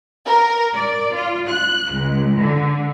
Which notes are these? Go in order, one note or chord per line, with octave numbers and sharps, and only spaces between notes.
A#4
D5
F4
F#6
C#2
D3